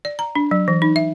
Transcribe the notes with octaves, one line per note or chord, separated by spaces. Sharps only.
D5
A#5
D4
F#3
E3
D#4
E5